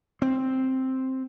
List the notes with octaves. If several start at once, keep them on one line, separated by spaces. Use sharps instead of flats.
C4